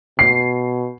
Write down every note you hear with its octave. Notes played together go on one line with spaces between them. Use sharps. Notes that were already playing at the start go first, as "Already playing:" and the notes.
B2 C7